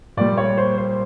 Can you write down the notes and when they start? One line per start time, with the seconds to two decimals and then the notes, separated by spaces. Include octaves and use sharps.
0.17 A#2 G3 D5
0.38 C#5
0.58 C5
0.78 C5